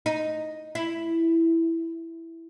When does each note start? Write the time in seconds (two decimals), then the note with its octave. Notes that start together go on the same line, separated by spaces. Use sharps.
0.06 D#4
0.75 E4